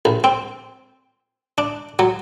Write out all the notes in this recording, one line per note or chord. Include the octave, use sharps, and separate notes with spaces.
A#1
C4
D4
F#3